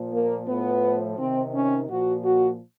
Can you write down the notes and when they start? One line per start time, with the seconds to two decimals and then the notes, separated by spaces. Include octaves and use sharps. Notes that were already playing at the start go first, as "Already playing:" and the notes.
Already playing: A#2 F3
0.12 A#3
0.47 A2 F3 B3
1.17 C3 D#3 C4
1.54 C#4
1.88 A#2 F3 F#4
2.24 F#4